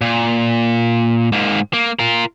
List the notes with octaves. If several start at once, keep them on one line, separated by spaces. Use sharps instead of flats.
A#2
G#2 A#3
A#3
F4 A#4